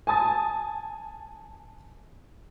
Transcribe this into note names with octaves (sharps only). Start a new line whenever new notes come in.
G#5 A5 D#6 A6